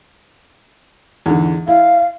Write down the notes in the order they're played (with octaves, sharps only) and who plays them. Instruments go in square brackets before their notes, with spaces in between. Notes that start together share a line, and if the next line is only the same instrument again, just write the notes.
[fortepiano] E2 G#2 D3
[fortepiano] E4 [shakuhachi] F5